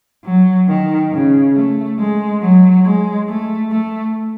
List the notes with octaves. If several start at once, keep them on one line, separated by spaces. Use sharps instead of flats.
F#3
D#3
C#3
A3
G#3
F#3
G#3
A3
A3